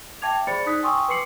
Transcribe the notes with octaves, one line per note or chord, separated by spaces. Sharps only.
E5 G5 A5 D6 G#6 F7
G#4 C5 D5 B5 A6 C#7
D#4 D5 D#6 F#6 B6
G5 G#5 C6 C#6 D#6 E6
B4 C6 D6 C7 C#7 F#7